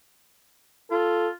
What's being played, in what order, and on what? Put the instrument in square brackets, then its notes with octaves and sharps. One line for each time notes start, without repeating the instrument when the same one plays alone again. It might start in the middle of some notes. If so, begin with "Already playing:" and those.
[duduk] F4 [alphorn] A4